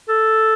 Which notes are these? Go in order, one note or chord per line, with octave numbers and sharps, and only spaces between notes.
A4